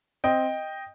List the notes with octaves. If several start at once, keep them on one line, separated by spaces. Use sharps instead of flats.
C4 D#5 G5